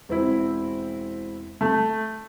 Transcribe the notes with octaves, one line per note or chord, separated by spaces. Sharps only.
E1 C4 E4
A3